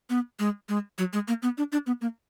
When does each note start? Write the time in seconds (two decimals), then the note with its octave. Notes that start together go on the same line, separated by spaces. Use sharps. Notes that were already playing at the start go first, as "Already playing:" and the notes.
0.10 B3
0.39 G#3
0.69 G#3
0.98 F#3
1.13 G#3
1.28 A#3
1.42 B3
1.58 D4
1.72 D4
1.87 B3
2.01 A#3